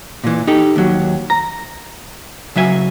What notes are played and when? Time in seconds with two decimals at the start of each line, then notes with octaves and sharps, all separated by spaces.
0.24 A#2 E3
0.47 D#4 G4 A4
0.76 D#2 F#3
1.30 A#5
2.56 C#3 F#3 E5 G#5